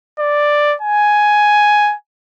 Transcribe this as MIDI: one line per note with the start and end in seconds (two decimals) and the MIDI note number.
0.20 0.75 74
0.82 1.95 80